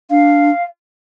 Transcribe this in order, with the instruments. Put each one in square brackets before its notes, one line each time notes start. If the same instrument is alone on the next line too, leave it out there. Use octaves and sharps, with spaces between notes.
[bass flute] D4 [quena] F5